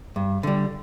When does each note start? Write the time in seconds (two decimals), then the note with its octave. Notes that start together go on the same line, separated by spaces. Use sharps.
0.16 G2
0.43 D3 G3